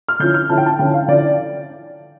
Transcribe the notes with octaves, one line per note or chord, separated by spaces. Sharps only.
F6
D3 F3 C#4 E4 G6
F6
D3 F3 C#4 E4 A5
G5
A5
D3 F3 C#4 E4 G5
F5
D3 F3 C#4 E4 D5